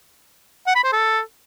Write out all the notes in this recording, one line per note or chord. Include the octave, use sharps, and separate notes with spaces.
F#5
B5
C5
A4